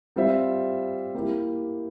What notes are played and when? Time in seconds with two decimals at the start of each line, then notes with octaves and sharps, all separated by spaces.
0.16 G3 C4 F4 C5 E5
1.15 A#3 E4 G4